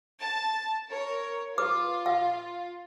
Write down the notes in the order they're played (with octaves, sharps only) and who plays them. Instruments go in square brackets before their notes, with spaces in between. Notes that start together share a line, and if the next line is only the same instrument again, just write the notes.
[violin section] A5
A#4 C#5
[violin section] F4 [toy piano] B4 D6
[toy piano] F5